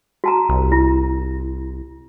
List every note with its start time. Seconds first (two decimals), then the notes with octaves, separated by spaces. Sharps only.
0.24 F#4 A5 A#5
0.49 C2
0.72 E4